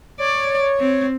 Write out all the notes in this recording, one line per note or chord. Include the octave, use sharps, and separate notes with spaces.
C#5 D5
C4